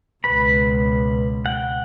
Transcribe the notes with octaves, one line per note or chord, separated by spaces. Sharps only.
C#2 B2 B4 B5
F#5 G5